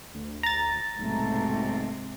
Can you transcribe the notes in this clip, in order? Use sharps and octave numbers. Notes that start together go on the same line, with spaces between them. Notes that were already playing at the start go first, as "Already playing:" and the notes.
D2
A#5 A6
B1 G#2 C3 A3